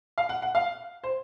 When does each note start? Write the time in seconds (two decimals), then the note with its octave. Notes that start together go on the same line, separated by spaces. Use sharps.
0.18 F5
0.29 F#5
0.42 F#5
0.55 F5
1.04 C5